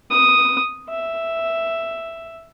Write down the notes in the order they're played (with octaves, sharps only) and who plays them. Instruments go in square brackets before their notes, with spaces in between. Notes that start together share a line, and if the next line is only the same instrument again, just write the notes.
[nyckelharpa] D#6
E5